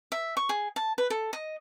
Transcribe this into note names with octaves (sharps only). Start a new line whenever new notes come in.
E5
C#6
G#4
A5
B4
A4
D#5